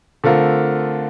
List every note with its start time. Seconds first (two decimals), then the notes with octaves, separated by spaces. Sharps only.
0.24 D3 A3 C4 F4 A#4